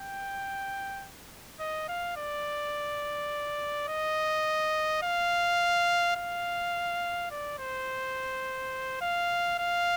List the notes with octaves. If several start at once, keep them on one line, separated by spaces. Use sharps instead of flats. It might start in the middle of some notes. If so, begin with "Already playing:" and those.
Already playing: G5
D#5
F5
D5
D#5
F5
F5
D5
C5
F5
F5